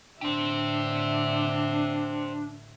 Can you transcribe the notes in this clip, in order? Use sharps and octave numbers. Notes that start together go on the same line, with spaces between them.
A1 D3 D4 G4 C5 E5